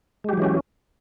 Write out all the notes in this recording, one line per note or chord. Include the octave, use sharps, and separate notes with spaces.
E3 F#3 G#3 C#4 G4